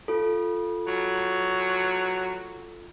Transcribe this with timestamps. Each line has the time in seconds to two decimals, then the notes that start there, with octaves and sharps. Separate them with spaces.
0.08 F4 A4
0.87 F#3